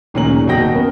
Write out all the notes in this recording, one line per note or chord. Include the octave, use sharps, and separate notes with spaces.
D1 A#2 D#3 C#4 A#5 F#7
F#1 B2 F#4 G5 A#6
B3 C#4 A#4